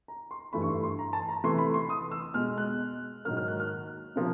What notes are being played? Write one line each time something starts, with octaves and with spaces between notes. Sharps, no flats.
A#5
C6
G2 E3 A3 B5
C#6
C6
C6
A#5
A5
A#5
C3 E3 A3 C6
B5
C6
D#6
E6
B2 G#3 F6
F#6
G#2 D#3 F#3 A#3 F6
F6
F#6
F6
C3 F3 A#3